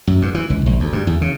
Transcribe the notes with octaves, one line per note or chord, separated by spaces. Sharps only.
F#2
G2
E3
C#2
A#1
D2
G2
E2
C#3